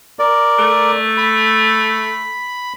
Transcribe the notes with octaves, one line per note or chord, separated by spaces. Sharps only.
A#4 D5
A3
B5